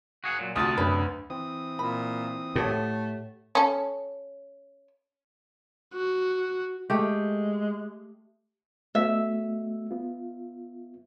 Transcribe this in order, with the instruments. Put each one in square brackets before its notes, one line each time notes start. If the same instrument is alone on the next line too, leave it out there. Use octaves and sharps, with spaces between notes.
[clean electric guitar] F#4 G#4 F#5
A#2 F#3
[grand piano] D2 D#6 [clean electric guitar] C3 A5 [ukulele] F4 F#4
[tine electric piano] F#2 D4 [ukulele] B4 C#5 B5
[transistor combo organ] E3 C4 D#6
[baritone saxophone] A#2 [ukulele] B5
[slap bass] A2 [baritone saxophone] A3 [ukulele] G4 C#5 F#5
[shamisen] C#4 A4
[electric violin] F#4
[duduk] G#3 [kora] A3 G4
[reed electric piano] A3 B3 F#4 [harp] E5
[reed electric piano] B3 F4